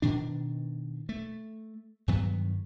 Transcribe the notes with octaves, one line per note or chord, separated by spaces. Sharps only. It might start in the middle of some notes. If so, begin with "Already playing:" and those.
B2 D#3 D4
A3
G2 D#3 F#3 B3